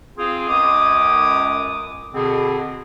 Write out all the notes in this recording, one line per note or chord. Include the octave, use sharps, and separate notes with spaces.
C4 F4 G#4
C#2 F#2 D6 D#6
B2 D3 C4 G#4